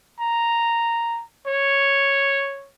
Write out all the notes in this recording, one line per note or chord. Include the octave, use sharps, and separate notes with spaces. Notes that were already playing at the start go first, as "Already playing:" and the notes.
A#5
C#5